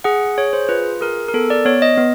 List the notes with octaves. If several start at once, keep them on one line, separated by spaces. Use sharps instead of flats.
G#4 F#5
G#4 C#5
C5
F4 B4
G#4 A#4
A#4
B3 A4
D5
B3 C#5
D#5
B3